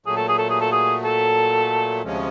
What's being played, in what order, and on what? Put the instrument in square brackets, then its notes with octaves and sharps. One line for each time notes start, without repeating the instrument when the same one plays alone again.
[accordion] A#2 F#3 A3 [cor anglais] G#4
[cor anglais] A4
G#4
A4
G#4
A4
G#4
A4
[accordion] D2 C3 F3 G#3 C#4